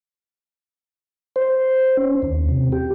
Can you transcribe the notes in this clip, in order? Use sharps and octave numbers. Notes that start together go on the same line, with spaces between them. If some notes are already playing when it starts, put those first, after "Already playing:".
C5
C#4
D#2
C3
G4